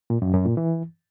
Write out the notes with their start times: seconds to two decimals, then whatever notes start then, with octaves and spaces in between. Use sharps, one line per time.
0.10 A#2
0.22 F#2
0.34 F#2
0.45 A#2
0.57 E3